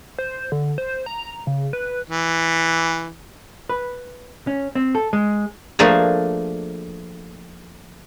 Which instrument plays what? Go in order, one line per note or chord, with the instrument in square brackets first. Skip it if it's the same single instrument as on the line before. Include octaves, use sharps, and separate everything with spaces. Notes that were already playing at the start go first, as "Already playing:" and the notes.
[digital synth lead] C5
D3
C5
A#5
C#3
B4
[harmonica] E3
[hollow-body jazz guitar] B4
C#4
C4
A4
G#3
[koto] F3 A3 A#3 D4 G#4